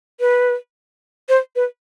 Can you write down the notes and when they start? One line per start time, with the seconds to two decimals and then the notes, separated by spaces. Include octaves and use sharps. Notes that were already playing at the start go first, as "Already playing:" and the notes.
0.20 B4
1.29 C5
1.56 B4